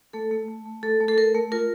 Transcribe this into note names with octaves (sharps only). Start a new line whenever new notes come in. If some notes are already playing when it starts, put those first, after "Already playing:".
A3 A4
A3
A3
A3
A3 A4
A3
A4
A3 A#4
A3
F4 A#4